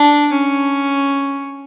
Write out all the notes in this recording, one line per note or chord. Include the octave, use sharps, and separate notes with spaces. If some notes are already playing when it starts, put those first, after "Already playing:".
Already playing: D4
C#4